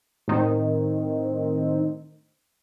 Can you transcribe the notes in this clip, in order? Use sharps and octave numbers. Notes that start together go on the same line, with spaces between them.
A2 D#3 C4 D#4